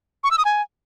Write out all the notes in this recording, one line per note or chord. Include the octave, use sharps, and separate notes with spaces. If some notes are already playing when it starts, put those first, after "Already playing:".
C#6
E6
D#6
G#5